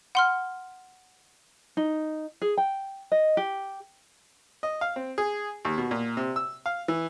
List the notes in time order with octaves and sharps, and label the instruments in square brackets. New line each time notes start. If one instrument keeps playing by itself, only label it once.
[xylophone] F#5 C6 F6
[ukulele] D#4
G#4
G5
D#5
G4
[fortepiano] D#5
F5
C4
G#4
D#2
B2
A#2
C3
E6
F5
E3